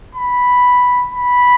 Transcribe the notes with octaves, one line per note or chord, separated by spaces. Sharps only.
B5
B5